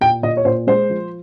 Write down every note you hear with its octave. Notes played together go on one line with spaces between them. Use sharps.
A#2 G5
A#2 D#5
C#5
A#2 C5
G#3 C5
F3